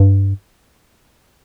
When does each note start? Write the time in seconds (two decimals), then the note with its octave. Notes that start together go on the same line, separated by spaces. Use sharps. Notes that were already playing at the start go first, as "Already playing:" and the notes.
Already playing: G2